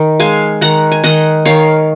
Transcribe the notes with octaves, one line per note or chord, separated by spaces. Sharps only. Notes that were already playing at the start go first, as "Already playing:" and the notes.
Already playing: D#3
G#3 F5 G#5
D#3 F#5 A#5
G#5
D#3 D#5 F#5
D#3 C#5 F5